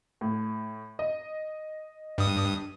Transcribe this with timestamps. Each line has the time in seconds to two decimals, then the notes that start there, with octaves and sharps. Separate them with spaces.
0.21 A2
0.99 D#5
2.18 G2 D#6